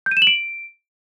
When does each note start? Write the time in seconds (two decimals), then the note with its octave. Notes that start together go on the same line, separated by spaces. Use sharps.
0.06 G6
0.11 D#7
0.17 E7
0.22 F#7
0.27 D7